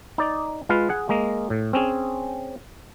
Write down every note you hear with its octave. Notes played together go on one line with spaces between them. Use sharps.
D#4 D5
G#3 F4 B4 F5
G#4 F#5
G#3 A#3 D#5
A2
C4 C#4 G#4